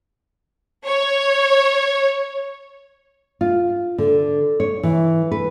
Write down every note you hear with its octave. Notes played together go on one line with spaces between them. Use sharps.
C#5
F4
D3
C#5
E3
B4